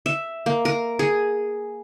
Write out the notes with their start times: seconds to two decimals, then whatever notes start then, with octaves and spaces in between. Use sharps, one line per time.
0.06 E5
0.46 A#3
0.65 A#4
0.99 G#4